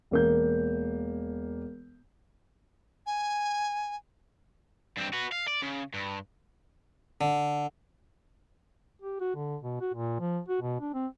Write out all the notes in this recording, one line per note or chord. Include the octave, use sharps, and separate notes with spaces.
E1 A#3 G6
G#5
G2 C4
F#4 B4
F5
D5
C#3
G2
D3
G4
F#4
D3
B2
F#4
A#2
F3
F#4
B2
D4
C4